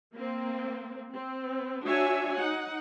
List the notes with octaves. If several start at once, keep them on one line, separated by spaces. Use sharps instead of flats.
A#3 C4
C4
D4 F#4 C#5 E5 G#5
D#4 F#5